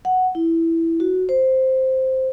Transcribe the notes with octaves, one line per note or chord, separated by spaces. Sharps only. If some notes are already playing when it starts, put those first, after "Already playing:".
F#5
E4
F#4
C5